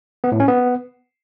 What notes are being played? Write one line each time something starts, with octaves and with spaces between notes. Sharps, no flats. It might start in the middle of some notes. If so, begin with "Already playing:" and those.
B3
A2
C#4
B3